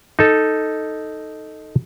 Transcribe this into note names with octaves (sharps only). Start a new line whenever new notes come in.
D#4 A4